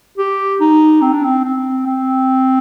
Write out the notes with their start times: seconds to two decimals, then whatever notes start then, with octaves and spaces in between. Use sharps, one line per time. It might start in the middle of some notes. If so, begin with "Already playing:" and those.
0.18 G4
0.60 D#4
1.02 C4
1.13 D4
1.24 C4
1.44 C4
1.86 C4